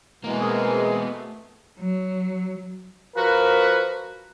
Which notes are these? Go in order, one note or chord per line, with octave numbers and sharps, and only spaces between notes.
B2 E3 G#3 A#3 B3 A#5
C4 G#4 A#4
A3
F#3
F3 F#4 A#4 B4